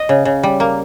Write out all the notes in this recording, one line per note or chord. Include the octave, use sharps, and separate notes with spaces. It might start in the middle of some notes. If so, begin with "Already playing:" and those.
Already playing: D#5
C#3
C#3
G3
A#3